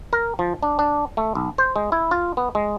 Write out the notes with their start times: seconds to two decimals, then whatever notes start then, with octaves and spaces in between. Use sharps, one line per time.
0.13 A#4
0.39 F3
0.63 D4
0.79 D4
1.17 A3
1.35 B1
1.58 C5
1.76 G#3
1.92 E4
2.11 F4
2.37 B3
2.55 G#3